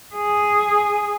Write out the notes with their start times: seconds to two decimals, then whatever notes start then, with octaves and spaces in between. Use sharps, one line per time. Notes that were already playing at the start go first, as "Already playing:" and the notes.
0.15 G#4